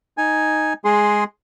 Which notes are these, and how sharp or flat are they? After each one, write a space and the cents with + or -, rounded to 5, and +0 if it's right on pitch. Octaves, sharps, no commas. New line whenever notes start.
D#4 +0 G#5 +0
G#3 +0 G#4 +0 C6 +0